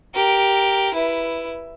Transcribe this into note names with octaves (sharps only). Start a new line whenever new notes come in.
G4 A#4
E4 B4